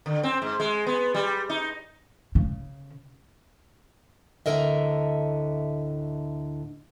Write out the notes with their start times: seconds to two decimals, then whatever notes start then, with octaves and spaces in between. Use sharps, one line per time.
0.06 D3
0.23 C4
0.42 G#2
0.60 G#3
0.87 B3
1.15 G3
1.50 D#4
2.35 C#3
4.46 D2 A2 D3 A#4 D#5 E5